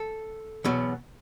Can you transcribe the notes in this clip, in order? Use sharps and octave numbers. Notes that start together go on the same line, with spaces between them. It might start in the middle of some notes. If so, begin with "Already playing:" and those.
Already playing: A4
E2 B2 F#3